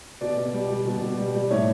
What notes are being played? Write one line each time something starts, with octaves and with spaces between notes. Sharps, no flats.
B2 D5
B2
G3
G3
B2
B2
G3
G3
A2 C#5